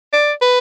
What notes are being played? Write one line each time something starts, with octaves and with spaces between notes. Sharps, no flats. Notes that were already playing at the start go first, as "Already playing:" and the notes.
D5
B4